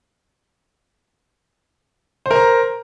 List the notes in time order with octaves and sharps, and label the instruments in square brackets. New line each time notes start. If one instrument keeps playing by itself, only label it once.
[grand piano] C5
A#4
A#5